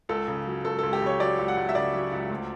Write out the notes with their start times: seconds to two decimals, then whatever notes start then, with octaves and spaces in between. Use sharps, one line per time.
0.09 C#2 A4
0.28 C#3
0.47 F#3
0.65 C#2 A4
0.79 C#2 A4
0.93 G4
1.02 C#3 C#5
1.20 F#3 D5
1.38 C#2
1.48 F#5
1.57 C#2
1.69 E5
1.75 C#3 D5
1.94 F#3
2.12 C#2
2.30 D2